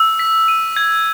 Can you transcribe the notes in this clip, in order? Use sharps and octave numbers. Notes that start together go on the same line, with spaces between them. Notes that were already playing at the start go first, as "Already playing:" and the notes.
Already playing: E6
B6
D#7
G#6